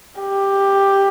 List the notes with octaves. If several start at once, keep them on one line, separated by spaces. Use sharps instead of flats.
G4